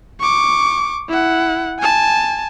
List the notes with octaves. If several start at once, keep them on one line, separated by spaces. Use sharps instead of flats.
C#6 D6
E4 F#5
G#5 A5